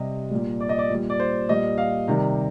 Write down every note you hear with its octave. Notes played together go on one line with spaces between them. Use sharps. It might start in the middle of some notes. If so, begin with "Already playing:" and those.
Already playing: C3 G3 D#5
A#2 G3
D5
D#5
D5
A#2 G3
D5
C5
A#2 G3 D#5
F5
C3 D#3 G3